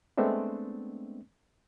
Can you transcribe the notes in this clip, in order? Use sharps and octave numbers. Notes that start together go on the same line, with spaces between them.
G#3 A3 B3 C4 D4